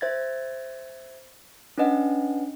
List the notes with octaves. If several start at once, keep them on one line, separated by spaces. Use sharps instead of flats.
C5 E5 G#6 A6
C#4 D4 B4 D#5 F#5